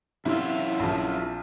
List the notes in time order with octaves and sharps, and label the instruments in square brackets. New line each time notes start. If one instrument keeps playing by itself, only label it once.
[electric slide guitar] F#2 F4 [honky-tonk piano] C3 E4
[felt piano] A#1 F3